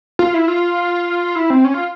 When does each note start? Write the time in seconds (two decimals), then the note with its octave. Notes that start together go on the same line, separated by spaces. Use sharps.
0.19 F4
0.34 E4
0.48 F4
1.36 E4
1.50 C4
1.65 C#4
1.74 F4